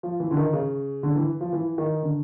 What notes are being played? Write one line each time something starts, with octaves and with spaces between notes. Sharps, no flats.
F3
E3
D3
D#3
C#3
D3
E3
F3
E3
D#3
D3